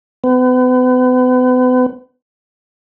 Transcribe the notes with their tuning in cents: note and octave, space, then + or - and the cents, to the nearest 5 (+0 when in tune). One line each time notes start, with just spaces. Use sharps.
B3 +40